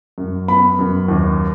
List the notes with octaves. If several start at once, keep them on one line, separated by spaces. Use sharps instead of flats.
F#2
B3 B5
F#2
D#2